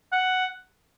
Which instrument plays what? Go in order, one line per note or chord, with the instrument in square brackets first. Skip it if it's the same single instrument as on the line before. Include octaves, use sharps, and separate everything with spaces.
[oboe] F#5